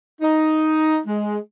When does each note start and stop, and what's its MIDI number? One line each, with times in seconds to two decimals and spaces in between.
0.21 0.99 63
1.06 1.38 56